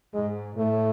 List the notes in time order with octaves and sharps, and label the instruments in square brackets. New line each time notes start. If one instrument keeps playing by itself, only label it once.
[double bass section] G#2 [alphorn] G#3
[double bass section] A2 [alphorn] A3